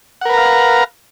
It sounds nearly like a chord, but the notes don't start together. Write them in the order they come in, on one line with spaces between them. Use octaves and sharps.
F#5 A#4 B4 A#5 F5